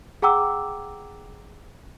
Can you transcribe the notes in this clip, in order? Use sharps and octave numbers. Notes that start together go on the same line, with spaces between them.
G#4 F#5 G5 A#5 D6 E6